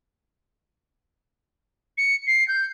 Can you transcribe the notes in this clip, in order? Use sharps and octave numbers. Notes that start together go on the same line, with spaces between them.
C#7
C7
G6